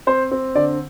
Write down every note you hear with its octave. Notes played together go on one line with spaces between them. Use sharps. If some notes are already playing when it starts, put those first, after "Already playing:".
C4 C5
C4
D3 D5